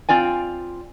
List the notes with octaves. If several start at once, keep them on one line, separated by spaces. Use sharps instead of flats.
C4 F4 D5 G#5